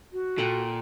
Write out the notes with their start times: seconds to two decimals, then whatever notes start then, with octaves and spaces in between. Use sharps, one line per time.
0.12 F#4
0.38 A#2 A4 F#5 G5